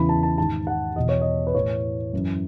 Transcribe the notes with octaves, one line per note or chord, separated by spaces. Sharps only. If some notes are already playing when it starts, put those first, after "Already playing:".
Already playing: E2 C#3 E3 B5
A5
A5
G#2 D#3 A5
F#5
E2 B2 D#5
C#5
D#5
B4
A2 E3 C#5
F#2 E3